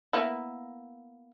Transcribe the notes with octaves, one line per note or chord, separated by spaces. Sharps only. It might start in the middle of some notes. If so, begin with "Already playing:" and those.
A#3 B3 E4